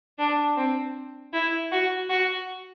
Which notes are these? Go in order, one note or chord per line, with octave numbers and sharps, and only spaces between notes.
D4
C4
E4
F#4
F#4